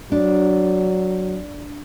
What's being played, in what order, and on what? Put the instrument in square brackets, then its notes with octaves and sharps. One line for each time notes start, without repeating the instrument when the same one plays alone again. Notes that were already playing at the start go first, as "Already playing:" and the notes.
[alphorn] F#3 [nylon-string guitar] D4